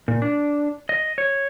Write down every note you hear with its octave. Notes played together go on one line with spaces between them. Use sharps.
A#2
D4
D#5
C#5